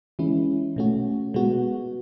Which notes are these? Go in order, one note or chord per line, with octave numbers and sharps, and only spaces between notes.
E3 G#3 C#4 E4
B2 A3 C#4 F#4
B2 G#3 B3 F#4